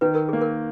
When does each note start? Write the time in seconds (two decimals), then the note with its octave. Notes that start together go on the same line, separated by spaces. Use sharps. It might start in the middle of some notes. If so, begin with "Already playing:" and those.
0.01 D#3 B4
0.15 A#4
0.29 A#3 G#4
0.41 A#4